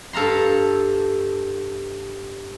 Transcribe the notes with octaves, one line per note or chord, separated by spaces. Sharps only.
G2 A4 F5 A#5 C6